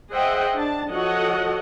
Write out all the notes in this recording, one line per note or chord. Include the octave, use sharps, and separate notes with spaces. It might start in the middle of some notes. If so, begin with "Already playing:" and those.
G#4 C5 D#5 E5 F#5 G5
D4 A5
F3 F#4 A4 C#5 D#5 F#5